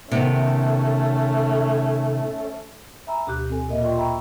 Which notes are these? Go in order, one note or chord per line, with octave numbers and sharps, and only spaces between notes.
C3 D#3 A3 B3 C#4
E5 G#5 A#5 B5 E6
D2 B2 G4 D6 F#6 G6
C4 A4 G#5
A#2 A#3 D#5 E5
F4 D5 D#5 G5 C6 C#6
E5 G5 A#5 B5 C#6 E6